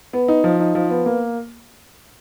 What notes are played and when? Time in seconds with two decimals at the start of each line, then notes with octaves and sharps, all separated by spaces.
0.13 B3
0.28 D#4
0.44 F3
0.60 D#4
0.75 F3
0.90 B3
1.06 A#3